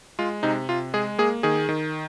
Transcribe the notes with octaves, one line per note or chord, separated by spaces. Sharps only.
G#3 F4
C3 D#4
C3 F4
G#3 G#4
A#3 G#4
D#3 G#4
D#3